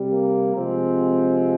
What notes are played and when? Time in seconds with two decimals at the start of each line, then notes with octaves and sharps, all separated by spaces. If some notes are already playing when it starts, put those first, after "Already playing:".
Already playing: C3 G3
0.11 A#3
0.55 C3 F3 G#3 C4